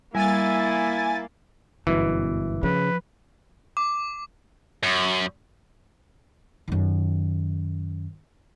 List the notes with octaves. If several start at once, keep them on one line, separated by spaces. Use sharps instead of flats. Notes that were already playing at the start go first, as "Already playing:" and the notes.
G3 A#3 E4 G#5 A6
G1 F#2 B2 E3
C#3 F3 B4
D6
F#2
F#2 D#3